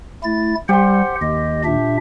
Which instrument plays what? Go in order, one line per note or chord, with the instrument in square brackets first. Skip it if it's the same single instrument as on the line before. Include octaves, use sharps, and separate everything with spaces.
[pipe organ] A3 E4 A6
[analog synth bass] G3 [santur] G4 C6 [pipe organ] C5 F#5
[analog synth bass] D#2 [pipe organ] D#5
[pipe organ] A#2 D4 E5